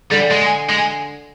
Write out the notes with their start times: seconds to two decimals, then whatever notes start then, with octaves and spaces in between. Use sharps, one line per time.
0.11 D3 G3
0.31 G#3
0.70 G#3